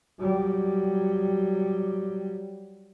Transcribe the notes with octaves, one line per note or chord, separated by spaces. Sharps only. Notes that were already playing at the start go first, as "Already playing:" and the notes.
F#3 G3